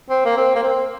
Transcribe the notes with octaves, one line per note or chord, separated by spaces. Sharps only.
C4
A#3
C4
A#3
C4